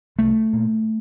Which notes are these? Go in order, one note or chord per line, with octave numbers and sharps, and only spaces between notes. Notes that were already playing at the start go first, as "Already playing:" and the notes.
C2 A3
A#2